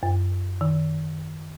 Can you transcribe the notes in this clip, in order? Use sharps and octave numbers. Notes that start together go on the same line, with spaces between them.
F#2
D#3